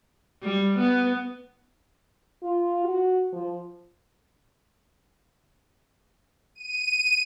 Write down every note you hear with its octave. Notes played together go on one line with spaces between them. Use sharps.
G3
B3
F4
F#4
F3
D#7